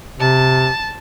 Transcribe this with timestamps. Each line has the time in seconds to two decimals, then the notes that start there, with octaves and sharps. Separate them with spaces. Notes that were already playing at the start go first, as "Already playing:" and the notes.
0.19 C3 A5